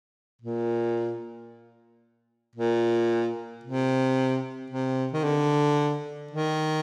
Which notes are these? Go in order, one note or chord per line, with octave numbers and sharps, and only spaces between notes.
A#2
A#2
C3
C3
D#3
D3
D#3